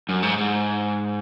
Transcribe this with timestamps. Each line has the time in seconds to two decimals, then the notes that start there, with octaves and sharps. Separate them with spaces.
0.09 F#2
0.23 G#2
0.38 G#2